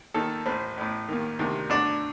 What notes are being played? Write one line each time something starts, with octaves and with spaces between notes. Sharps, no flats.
D#2 D#3 A4
A1 A2 C4
A1 A2
D#2 D#3
D2 C3 D#3
D2 D3 D4